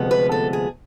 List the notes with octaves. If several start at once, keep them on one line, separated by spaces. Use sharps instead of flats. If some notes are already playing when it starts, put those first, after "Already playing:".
Already playing: D2 C3 F3 G#3 B3
B4
A4
G#4